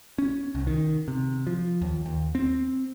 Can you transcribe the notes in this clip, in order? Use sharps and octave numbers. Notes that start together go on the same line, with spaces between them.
C#4
C2
D#3
C3
F3
D#2
D#2
C4